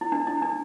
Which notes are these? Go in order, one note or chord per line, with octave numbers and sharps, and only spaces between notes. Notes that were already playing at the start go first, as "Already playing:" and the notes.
E4
D4
E4
D4